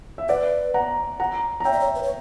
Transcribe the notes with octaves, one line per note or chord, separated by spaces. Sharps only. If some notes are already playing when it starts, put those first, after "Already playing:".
E5
B4 D5 F#5
F#5 A#5
F#5 A#5
A#5
C#5 E5 G5
D5
C#5
B4
C#5